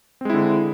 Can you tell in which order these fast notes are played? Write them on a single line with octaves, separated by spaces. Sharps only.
C4 G#3 E4 D3